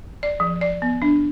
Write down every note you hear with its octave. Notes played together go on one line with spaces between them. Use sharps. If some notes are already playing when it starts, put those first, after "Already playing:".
D5
F3
D5
B3
D4